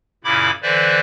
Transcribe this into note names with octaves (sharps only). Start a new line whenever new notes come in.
F#2 A#2 C#3 E4 B5 D6
D3 E3 B4 C5 D5 E5